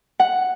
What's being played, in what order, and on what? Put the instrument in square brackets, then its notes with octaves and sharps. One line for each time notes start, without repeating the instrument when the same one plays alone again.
[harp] F#5